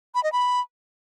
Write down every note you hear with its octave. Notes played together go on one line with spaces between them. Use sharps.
B5
D#5
B5